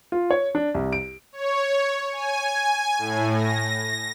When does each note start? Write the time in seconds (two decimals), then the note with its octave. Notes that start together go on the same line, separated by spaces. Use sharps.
0.12 F4
0.31 C#5
0.55 D4
0.74 C2
0.93 D7
1.33 C#5
2.12 G#5
2.98 A2
3.35 A#6